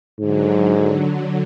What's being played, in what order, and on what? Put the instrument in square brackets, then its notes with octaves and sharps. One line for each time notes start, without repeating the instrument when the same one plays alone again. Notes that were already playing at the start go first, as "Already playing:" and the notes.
[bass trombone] G#2 [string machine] D3 F#3